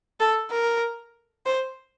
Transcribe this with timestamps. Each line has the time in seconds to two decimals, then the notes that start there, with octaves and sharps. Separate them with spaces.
0.20 A4
0.51 A#4
1.46 C5